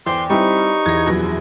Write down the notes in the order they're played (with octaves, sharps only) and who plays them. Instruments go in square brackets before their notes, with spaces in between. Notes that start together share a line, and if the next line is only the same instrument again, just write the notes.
[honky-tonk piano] E2 [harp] C5 D5 G5 [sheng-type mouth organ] C6
[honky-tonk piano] G3 C4 E4 [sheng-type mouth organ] D#4 C#6 [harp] G4 B4 G#5
[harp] E2 [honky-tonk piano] G#6 A#6
[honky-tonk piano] A#1 F#2 B2